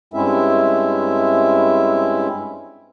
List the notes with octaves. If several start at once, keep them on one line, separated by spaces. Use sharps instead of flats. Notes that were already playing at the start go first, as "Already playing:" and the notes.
G2 G#3 C4 C#4 E4 E5